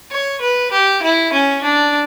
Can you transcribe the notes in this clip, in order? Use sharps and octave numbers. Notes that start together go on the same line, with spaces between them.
C#5
B4
G4
E4
C#4
D4